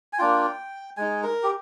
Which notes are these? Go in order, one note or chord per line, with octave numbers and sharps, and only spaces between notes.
G#5
A#3 D4 F4 G5
G#3 D#4 G#5
A#4
G4